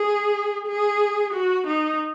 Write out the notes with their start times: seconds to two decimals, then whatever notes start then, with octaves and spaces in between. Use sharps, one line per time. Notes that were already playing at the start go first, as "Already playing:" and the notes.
Already playing: G#4
0.67 G#4
1.33 F#4
1.67 D#4